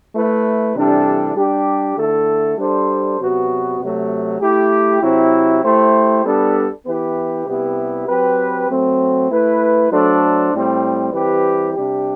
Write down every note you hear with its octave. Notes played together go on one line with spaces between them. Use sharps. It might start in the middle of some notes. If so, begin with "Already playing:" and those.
A3 E4 B4
C3 E3 G3 D4 A4
G3 D4 G4
D3 A3 E4 A4
G3 D4 A4 C5
C3 F#3 B3 F#4 B4
C3 F#3 A3
A3 E4 G4
C3 F#3 C4 E4
A3 E4 G4 C5
G3 B3 D4 A4
E3 B3 E4 G4 B4
C3 G3 B3 E4 G4
F#3 C4 G4 B4
F#3 A3 C4
A3 E4 B4
F#3 A3 D4 A4 C5
A2 G3 C4
E3 G3 C4 G4 B4
C3 G3 D4 G4